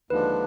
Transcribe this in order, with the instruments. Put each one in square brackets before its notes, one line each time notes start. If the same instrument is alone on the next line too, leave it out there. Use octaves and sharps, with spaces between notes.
[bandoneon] D#2 D3 F3 G#3 D4 [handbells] B4